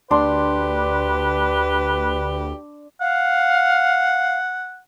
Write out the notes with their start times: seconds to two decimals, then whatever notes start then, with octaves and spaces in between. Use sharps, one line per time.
0.11 D2 D4 G4 B4 C6
3.01 F5 F#5